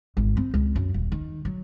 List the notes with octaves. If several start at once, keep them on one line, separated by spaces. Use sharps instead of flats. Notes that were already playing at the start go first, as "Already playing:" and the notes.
G#1
C4
C#2
F#2
D#1
D#3
F#3